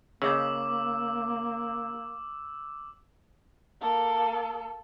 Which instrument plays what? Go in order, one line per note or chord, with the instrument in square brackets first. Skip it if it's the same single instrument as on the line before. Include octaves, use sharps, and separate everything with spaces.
[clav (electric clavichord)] C#3 [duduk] A#3 [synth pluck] G#4 D#5 G6 [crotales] D6 E6
[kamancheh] A#3 A4